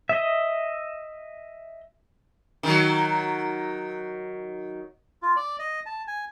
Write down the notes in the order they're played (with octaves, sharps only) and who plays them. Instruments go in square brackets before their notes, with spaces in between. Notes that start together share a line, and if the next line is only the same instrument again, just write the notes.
[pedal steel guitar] D#5 E5
[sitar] D#3 F#3
[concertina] F4
D5
D#5
A5
G#5